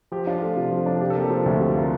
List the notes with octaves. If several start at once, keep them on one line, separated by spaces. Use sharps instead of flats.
F3 G4
D4 F4
A3 F4
C3 F4
F3
D4
C3 G4
A4
A#3 G4
F3
D2 F4
C3
A#3 F4